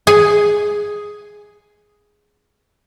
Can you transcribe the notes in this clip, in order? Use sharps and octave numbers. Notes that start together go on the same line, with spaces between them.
G#4 G#5